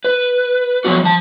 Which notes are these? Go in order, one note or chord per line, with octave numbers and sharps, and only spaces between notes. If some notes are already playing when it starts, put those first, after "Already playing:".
B4
F3 F#3 B3 F#4
F3 A5